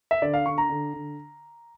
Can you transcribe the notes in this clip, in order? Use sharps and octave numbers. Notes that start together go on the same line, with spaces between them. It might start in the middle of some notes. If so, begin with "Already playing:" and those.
E5
D3 D5
F5
D3 C#6
A#5
D3
D3